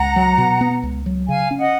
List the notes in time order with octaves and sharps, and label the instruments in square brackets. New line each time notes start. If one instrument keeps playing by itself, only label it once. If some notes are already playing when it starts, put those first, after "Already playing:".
Already playing: [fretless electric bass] C#2 [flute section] F#5 A#5
[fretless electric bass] F#3
B2
B3
C#2
F#3
[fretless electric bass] C#3 [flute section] F5 G#5
[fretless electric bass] C#4
[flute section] D#5 F#5